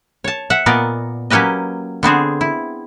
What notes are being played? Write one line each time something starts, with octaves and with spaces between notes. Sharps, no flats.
C#5 A5
E5 F#5
A#2 B3 A#4 D5 D#5
F#3 A#3 C#4 G4 B4 D#5
D3 B3 C4 G#4
E4